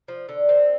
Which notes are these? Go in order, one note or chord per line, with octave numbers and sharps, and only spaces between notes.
F3
D3
C4